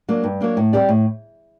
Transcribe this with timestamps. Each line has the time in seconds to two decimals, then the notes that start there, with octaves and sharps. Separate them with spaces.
0.08 F#3 A#3 D4
0.24 G2
0.41 F#3 A#3 D4
0.57 A2
0.73 G3 C4 G4 D5
0.89 A2